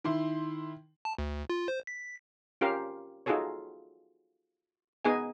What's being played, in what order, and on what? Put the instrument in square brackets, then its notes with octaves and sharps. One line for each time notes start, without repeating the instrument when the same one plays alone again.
[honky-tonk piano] D#3 E4 C6
[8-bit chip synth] A5
D2
F4
C5
B6
[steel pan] C#4 F4 G4 A#4 F5
D#4 F4 F#4 G#4 A4 C#5
B3 D#4 G#4 D#5 G#5